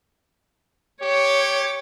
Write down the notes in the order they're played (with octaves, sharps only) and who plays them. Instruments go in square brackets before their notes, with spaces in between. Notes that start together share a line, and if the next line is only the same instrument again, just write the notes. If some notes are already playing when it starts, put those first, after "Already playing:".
[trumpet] G4 [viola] C#5